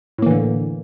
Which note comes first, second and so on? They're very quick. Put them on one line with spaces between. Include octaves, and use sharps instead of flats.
A2 A#3 E3 D3